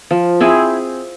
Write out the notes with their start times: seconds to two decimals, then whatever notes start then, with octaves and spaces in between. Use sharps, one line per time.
0.11 F3
0.40 C4 E4 G#4